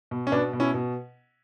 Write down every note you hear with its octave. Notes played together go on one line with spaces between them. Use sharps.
B2
C#4
B2 B3 D4
B2
C#4 E4
B2